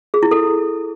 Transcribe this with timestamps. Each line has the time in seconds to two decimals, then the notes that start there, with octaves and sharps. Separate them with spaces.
0.14 G#4
0.23 E4
0.31 A4